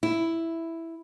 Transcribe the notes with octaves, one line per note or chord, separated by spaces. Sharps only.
E4